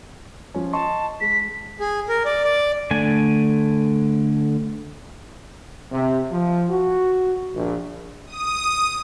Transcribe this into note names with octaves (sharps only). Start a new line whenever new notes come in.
F3 C#4
D#5 A5 C6 C#6
G#3 B6
G#4
A#4
D5
D5
D3 A3 G#5
C3
F3
F#4
A#1
D#6